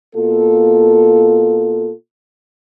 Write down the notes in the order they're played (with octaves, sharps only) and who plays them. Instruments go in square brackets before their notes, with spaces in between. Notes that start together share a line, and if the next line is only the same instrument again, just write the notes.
[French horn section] B2 A#3 F4 A4